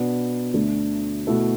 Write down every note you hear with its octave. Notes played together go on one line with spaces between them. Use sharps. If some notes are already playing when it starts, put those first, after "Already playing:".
Already playing: B2 B3 D4
D2 D3 A3 D4
B2 A3 E4 A4